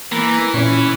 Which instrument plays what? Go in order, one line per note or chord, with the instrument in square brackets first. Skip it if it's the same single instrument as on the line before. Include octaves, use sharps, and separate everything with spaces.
[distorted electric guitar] E3 [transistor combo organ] A#3
[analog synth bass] A#2 [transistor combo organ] C#4